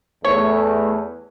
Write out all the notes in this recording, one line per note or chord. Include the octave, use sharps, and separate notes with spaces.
E2 A3 C#5